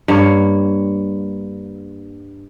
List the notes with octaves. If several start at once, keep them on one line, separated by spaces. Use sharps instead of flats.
G2 A#3 C#5